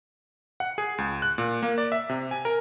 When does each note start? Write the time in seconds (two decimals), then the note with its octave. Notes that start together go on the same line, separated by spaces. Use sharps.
0.60 F#5
0.78 G#4
0.98 C#2
1.22 F#6
1.38 A#2
1.63 A#3
1.78 D5
1.92 E5
2.09 C3
2.31 G#5
2.45 A#4